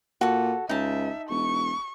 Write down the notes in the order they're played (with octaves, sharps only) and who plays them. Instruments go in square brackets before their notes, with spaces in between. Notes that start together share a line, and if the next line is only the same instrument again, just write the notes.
[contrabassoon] A#2 [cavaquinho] F#4 A4
[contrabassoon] C#2 [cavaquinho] D#4 A5 [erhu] E5
[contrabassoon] E1 [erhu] C#6